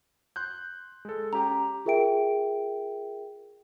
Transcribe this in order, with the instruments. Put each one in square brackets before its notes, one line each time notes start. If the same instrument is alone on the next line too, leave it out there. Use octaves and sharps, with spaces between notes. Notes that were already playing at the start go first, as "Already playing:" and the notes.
[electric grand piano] C6 F#6 G6
G#3 A4
[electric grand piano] C#4 G4 [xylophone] A#5
[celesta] F4 G#4 A#4 E5 G5 D7